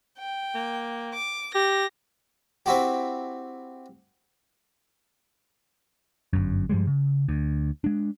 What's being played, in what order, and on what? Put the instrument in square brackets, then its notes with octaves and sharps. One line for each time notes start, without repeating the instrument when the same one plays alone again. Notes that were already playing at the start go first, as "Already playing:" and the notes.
[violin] G5
[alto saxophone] A#3
[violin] D6
[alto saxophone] G4 [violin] A#6
[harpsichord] C4 E4 F#4 G4
[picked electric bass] G1 F#2
G2 F3 G3 G#3
C#3
D2
G#3 D4